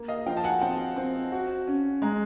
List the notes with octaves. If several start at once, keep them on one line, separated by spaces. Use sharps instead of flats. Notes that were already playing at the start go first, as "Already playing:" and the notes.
Already playing: A#3
D#5 F5
F3 F5 G5
A5
F#5 G#5
C4 G5 A5
C4
F#4
C#4
G#3 G#5 A#5